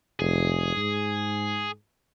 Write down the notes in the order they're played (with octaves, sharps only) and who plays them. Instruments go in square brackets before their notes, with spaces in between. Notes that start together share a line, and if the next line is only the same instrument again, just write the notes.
[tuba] F1 [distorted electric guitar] G#4
[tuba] G#2